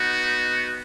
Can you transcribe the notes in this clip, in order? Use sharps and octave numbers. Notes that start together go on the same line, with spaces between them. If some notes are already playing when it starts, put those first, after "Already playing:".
Already playing: B3 D#4 F#4